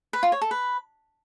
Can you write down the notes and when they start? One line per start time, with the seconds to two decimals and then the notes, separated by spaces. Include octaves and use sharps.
0.13 B4
0.23 F4
0.32 C#5
0.41 A4
0.51 B4